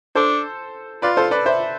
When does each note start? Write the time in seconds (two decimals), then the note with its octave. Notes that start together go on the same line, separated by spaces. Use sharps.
0.15 D4 A4 C5
1.02 F4 B4 D5
1.17 A4 C5
1.31 B4 D5
1.46 C5 E5